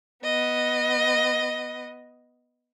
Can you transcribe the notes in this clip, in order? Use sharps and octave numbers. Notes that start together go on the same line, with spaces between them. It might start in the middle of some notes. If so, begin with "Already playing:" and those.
B3 D#5